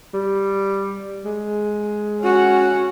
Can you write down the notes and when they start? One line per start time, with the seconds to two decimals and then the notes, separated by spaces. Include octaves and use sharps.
0.14 G3
1.25 G#3
2.21 C#4 F#4